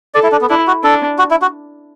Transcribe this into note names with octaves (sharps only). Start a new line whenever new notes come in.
A4 D5
E4
D4
B3
D4 E4
F#4
D4 A4
F#4
E4
F#4